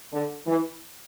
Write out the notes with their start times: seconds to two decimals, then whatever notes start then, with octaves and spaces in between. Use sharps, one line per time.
0.12 D3
0.47 E3